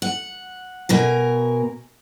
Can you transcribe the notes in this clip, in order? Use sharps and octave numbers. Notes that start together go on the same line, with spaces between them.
F#5
B2 A#4 G#5